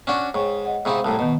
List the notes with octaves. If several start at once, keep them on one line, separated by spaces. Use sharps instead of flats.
C#4 D4 F#4
G#2 C#5 G5 C#6
D#5 F#5
G#2 C3 D#4 F5 B5 C#6
C2 A2 A5 A#5
B2 D#3 D#5